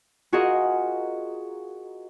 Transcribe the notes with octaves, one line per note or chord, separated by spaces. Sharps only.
F4 F#4 G#4 A#4 D#5